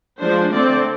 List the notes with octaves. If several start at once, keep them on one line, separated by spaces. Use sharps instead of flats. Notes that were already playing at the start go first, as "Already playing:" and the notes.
F3 G#3 D4 C5
D3 A3 C4 D5